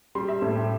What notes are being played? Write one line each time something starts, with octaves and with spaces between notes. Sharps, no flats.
G3 C6
E5
A2 A4
G4